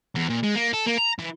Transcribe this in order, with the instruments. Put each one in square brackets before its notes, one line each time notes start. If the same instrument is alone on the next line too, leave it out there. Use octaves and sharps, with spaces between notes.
[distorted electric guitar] E2
A#2
G#3
A#3
A4
A#3
A#5
E3